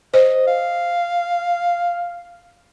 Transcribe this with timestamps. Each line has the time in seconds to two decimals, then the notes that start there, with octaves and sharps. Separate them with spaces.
0.14 C5 D#5
0.47 F5